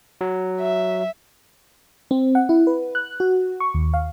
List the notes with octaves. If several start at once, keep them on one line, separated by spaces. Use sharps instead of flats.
F#3
E5
C4
F#5
E4
B4
F#6
F#4
C#6
D#2
F5